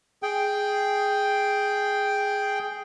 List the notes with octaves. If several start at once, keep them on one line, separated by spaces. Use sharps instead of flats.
G#4 G5